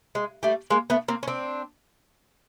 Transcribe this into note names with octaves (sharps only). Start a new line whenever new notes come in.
G#3
G3 A3
G#3 A#3
A3 B3
A#3 C4
C#4
C4 D4